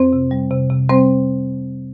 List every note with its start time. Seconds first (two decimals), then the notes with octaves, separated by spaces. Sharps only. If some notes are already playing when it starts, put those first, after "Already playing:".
Already playing: F2 C4 C5
0.13 C3
0.31 G3
0.51 C3
0.70 C3
0.89 G3 C4 C5